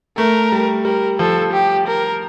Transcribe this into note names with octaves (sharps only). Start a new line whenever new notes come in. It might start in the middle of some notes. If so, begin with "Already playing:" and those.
A3 A#4
G3
G3 A#4
F3 A4
G4
A#4